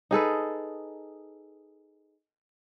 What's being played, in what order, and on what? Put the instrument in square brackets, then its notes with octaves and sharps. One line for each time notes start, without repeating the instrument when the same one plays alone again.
[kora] D#4 G#4 A4 B4